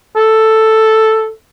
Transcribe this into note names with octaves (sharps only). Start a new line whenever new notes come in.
A4